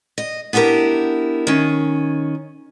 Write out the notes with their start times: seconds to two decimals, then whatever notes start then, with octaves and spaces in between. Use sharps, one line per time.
0.18 D#5
0.53 B3 D4 E4 G4 A#4
1.47 D#3 C#4